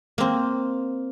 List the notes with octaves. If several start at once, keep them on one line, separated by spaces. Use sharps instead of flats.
A#3 C4